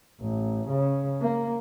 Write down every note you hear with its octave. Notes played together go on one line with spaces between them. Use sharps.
A1
C#3
A#3